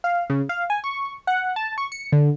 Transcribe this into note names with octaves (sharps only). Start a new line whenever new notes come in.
F5
C#3
F5
G#5
C#6
F#5
A5
C#6
C#7
D3